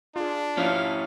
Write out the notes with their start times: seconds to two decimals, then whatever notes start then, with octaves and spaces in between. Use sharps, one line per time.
0.16 D4 F4 G#4
0.57 F3 C#4 E4 F5